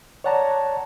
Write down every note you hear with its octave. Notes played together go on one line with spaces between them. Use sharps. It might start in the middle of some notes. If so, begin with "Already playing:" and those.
C#5 D5 F#5 A5 A#5